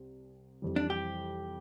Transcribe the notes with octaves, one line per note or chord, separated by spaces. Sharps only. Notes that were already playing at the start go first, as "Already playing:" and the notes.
Already playing: C2 C4
F2 E3 G3
D4
G4